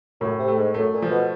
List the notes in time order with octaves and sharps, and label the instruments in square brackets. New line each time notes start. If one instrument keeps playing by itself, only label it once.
[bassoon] F#2 [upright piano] A2
[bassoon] C3
[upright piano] A3
[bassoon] G#2
[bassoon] F#2 [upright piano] A3
[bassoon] A#2
[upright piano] F3
[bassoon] B2